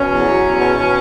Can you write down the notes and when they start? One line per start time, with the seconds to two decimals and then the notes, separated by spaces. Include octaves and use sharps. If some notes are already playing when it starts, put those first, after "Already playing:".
Already playing: B2 C#4
0.10 E2
0.26 F#3
0.42 E2
0.60 B2
0.76 B2